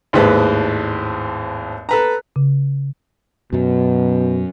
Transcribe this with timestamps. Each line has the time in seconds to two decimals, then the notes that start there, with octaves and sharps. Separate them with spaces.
0.13 G#1 D#2 A2 G#3 B4 C5
1.89 A4 B4 A#5
2.36 C#3
3.53 F#2 B2 F#3